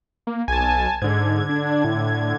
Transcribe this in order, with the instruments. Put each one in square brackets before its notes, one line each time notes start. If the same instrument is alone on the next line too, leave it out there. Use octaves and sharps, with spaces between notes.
[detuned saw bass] A#3
[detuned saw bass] B1 [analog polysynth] G#5 A5
[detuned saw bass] G#2 [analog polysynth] D3 G#6
[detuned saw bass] D4
A2